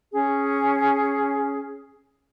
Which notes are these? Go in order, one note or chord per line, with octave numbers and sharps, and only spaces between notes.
C#4 G#4